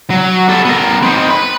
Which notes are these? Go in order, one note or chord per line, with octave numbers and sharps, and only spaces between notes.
F#3
G3 A4
B3 A#4
C4 D#4
B4 B5